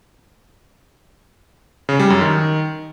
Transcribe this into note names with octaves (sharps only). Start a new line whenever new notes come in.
C#3
G3
F#2
D#3